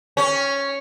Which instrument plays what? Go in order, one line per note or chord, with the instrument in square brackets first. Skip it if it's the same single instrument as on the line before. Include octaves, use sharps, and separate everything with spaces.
[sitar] C#4